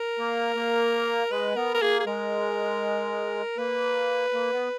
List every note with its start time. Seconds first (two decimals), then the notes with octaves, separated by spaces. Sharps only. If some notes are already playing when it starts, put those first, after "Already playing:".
Already playing: A#4
0.19 A#3
0.56 A#3
1.31 G#3 B4
1.56 B3 A#4
1.74 A#4
1.81 A#3 G#4
2.00 G#4
2.06 G#3 A#4
3.58 A#3 B4
4.33 A#3
4.52 B3